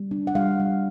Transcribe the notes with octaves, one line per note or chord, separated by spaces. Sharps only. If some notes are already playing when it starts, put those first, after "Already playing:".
Already playing: G3
D4
F#5
G3 F5
G3